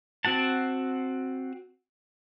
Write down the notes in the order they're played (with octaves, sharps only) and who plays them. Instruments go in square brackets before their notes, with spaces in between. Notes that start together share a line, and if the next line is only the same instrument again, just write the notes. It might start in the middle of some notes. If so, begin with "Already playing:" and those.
[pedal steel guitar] C4 F#4 F#5 A5